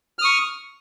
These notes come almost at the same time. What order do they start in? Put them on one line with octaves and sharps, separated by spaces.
F6 D#6 C#6